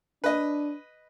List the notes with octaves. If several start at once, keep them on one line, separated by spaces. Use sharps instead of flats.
D4 B4 D#5